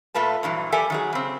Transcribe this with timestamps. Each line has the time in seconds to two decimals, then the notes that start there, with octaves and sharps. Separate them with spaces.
0.14 A#2 A3 F4 B4 A5
0.43 G2 A#2 E3 F#3
0.72 G4 A4 A#4 D5 E5 G#5
0.90 D#3 F#3 G#4
1.13 C#3 C4